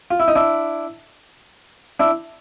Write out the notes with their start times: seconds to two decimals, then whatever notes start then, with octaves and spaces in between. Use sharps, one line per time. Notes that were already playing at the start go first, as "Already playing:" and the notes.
0.11 F4
0.20 E4
0.28 D#4
0.36 D4 E4
2.00 D4 E4